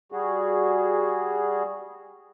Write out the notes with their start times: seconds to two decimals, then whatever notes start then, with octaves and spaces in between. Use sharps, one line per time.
0.12 G3 F#4 G#4